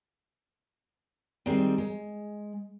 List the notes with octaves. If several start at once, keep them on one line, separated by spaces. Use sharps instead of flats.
D#3 G3 G#3 C4
G#3